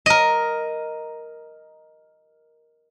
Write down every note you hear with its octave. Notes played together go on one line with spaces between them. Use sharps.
A#4 D#5